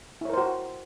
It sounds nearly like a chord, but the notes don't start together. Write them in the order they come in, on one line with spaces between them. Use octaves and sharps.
E4 C#5 A#4 C5 F#4